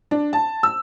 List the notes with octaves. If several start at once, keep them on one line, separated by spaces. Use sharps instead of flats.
D4
A5
E6